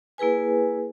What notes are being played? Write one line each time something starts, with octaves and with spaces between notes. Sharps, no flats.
A#3 E4 G#4 B4 G#5